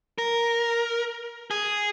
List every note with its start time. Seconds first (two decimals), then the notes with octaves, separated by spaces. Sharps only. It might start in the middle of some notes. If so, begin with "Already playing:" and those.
0.18 A#4
1.51 G#4